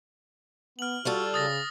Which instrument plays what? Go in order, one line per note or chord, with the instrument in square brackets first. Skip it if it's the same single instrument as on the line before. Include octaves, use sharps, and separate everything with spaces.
[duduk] B3 [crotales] F6 F#7
[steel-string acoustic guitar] G3 F4 A4 [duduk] F#4
[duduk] C#3 [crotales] D#6 A6 A#6